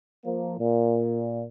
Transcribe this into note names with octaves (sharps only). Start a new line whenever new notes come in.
F3 A#3
A#2